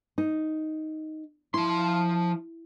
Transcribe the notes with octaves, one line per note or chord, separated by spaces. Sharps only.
D#4
F3 E4 C6